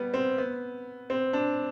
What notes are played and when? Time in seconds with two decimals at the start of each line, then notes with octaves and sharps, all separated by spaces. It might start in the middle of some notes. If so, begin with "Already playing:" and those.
Already playing: G3 B3
0.14 C4
0.38 B3
1.10 C4
1.33 D4